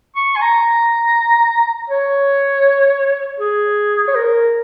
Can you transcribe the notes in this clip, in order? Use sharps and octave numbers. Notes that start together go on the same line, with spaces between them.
C#6
G#5
A#5
C#5
G#4
C#5
A#4